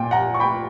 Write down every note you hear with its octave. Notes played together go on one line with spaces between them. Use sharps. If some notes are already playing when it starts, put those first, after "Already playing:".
Already playing: A#2 G5
F#5 A#5
C#6
G5 B5